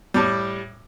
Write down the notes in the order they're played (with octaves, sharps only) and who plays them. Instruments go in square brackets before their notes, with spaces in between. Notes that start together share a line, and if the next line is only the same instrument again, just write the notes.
[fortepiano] A2 G3